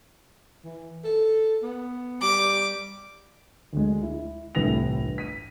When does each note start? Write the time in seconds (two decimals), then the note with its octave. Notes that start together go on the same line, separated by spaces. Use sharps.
0.64 E3
1.04 A4
1.63 B3
2.22 G3 D6
3.73 D2 G#3
4.03 E4
4.55 G1 C2 A2 E3 A#6 F7
5.18 B6 D#7